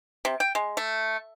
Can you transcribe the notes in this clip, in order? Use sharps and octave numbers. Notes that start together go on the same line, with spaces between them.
C3
G5
G#3
A3